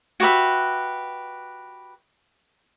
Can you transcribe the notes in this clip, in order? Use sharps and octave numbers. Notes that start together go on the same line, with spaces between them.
F#4 G4 B4 E5